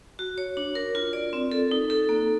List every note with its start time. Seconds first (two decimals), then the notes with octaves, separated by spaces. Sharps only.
0.19 F#4
0.38 C#5
0.57 D4
0.75 A#4
0.95 F4
1.13 D5
1.33 C4
1.52 A4
1.71 D#4
1.90 A4
2.09 A#3